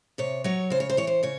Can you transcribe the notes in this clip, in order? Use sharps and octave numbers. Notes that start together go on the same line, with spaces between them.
C3 C#5
F#3 C#5
C#3 C5
C#5
C5
E3 C#5
C5
C#3 C#5